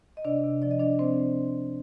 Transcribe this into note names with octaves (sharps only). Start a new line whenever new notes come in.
D#5
C3 D4 D5
C3
F3 D5
D#5
F3 D4 D5
C3 C4 C5